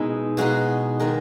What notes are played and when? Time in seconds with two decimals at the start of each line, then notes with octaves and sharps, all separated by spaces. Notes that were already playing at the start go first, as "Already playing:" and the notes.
Already playing: B2 G#3 D#4 E4
0.37 B2 G#3 D#4 F#4
0.99 D#3 G#3 A#4